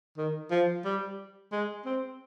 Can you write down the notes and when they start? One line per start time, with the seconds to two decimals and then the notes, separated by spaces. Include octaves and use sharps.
0.18 D#3
0.51 F3
0.85 G3
1.52 G#3
1.85 C4